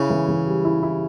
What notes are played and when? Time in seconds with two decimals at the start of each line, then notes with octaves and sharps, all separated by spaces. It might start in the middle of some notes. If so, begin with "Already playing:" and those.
Already playing: C#3 E4
0.10 E3
0.28 E3
0.47 G3
0.65 E4
0.83 E4